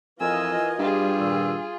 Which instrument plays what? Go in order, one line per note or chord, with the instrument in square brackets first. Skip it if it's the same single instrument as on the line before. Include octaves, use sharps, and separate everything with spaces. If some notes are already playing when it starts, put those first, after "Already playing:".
[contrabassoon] F2 [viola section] E3 F4 D#5 [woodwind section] A#4 G#5 [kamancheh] E6
[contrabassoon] G2 [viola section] G3 [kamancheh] F4 G#4
[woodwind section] A#2 D#3 E6